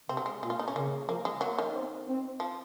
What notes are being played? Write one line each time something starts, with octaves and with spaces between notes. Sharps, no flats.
C3 C4
F#3
G#3
A#2 G#3
F4
D#4
C#4
C#3 A#3
F3 A#3
G#3
F#3 A#3
D#3
C4
C4
F3